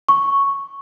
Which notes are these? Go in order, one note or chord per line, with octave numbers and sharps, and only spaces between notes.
C#6